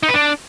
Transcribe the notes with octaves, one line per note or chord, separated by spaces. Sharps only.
D#4
B4
D4